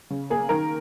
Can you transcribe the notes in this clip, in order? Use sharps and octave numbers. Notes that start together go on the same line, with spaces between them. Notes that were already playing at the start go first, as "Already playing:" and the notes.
C#3
A#3 G#4
D#3 A#4